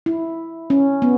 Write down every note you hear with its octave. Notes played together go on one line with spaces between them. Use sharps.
E4
C#4
B3